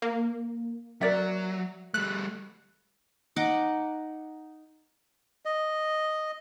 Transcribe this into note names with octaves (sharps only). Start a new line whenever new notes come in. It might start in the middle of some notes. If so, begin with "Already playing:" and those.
A#3
F#3 A#4 D5 E5
G3 A3 F#6
D#4 F#5 D6
D#5